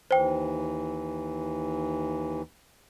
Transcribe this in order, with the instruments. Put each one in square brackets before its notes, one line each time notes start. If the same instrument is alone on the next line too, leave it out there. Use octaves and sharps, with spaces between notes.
[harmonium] D#2 E3 [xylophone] C5 G5